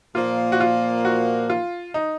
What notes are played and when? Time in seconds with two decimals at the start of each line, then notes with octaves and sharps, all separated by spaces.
0.15 A#2 F3 A#3 F4
0.52 F#4
0.60 F4
1.05 F#4
1.50 F4
1.94 D#4